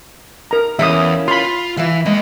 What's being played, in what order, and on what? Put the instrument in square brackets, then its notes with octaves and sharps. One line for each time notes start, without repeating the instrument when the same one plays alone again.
[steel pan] A#4 A#5
[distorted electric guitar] E2 [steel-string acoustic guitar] A#3 C#4 E4 [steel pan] E5 D#6
[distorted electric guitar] F4 [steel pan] B5 C6
[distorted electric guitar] E3 [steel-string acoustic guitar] E5 F5
[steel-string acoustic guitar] G#3 [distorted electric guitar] A#3 D#5